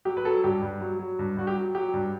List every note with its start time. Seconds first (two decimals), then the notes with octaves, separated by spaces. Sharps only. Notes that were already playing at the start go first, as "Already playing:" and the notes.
0.05 F#3 G4
0.17 B4
0.25 F#3 A4
0.44 G2 G4
0.62 G2
0.80 F#3
0.99 F#3
1.19 G2
1.37 G2 F#4
1.47 G4
1.56 F#3
1.75 F#3 G4
1.94 G2